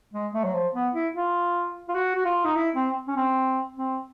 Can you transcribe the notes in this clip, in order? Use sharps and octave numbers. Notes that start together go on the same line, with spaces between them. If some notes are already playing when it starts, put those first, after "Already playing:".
G#3
A3
F#3
F3
B3
E4
F4
F4
F#4
F#4
F4
D#4
E4
C4
C#4
C4
C4